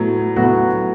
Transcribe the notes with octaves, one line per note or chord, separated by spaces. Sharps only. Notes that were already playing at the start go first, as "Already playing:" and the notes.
Already playing: A2 F#3 B3
A2 F#3 B3 F#4